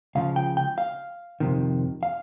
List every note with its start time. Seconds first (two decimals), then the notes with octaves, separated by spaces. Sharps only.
0.15 C#2 C#3 F3 F5
0.36 G5
0.57 G5
0.78 F5
1.40 F2 C3 D#3
2.03 F5